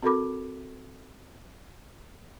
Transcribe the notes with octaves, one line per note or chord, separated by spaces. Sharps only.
C4 F#4 A4 A#4 B5 D6